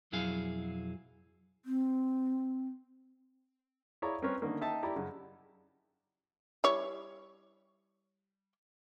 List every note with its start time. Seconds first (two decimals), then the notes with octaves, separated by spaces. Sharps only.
0.12 B1 F2 F#3 E4 G#4 F5
1.65 C4
4.02 E4 G#4 C#5 D5 F5 A#5
4.22 C4 C#4 A#4 B4 C#5
4.42 D3 D#3 A3 A#3 C#4
4.61 D#4 E5 G5 A5
4.83 E4 G4 D5 A#5
4.96 F#2 C#3
6.64 G3 E4 C#5